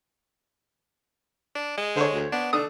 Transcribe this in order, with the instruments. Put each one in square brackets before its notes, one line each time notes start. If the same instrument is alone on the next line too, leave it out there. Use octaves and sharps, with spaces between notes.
[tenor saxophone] D4
G#3
[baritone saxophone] D3 [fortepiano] C5 C#5
[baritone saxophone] D2
[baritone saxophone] B3 [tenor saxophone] D4
[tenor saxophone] A3 [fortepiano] D4 D#6